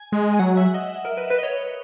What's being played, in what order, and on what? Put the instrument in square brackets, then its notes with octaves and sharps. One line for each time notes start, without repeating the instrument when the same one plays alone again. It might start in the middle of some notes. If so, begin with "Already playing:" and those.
Already playing: [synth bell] G#5
[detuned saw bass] G#3
[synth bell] G#5
[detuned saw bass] F#3 [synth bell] F#5
[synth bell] E5
D#5
A#4
B4
B4
D#5
C#5